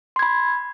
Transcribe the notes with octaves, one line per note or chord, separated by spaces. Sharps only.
B5 C6 G#6